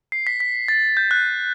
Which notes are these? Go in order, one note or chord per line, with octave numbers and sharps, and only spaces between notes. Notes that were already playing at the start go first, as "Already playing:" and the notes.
C7
B6
B6
A6
G6
F#6